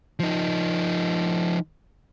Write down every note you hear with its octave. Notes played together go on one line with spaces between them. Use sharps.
F3 D#4